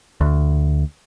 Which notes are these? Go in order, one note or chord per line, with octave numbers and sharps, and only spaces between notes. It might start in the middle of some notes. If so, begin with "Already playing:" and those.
D2